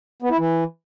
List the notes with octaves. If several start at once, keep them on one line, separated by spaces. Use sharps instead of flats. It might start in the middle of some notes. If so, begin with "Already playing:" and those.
B3
E4
E3